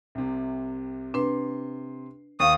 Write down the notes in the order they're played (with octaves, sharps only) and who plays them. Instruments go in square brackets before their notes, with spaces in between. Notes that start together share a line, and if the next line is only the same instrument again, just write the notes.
[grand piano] C2 C3
[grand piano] C3 C6 [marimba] D4 B4
[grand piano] D#2 [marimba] F5 C#6 [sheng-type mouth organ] D#6